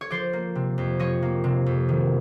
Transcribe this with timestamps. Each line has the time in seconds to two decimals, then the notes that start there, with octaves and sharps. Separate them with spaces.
0.01 C#5
0.11 F3 C5 D5
0.33 A#3
0.55 C3
0.78 F2
0.99 F3 C#5 D#5
1.22 A#3
1.44 C3
1.66 F2
1.89 D#3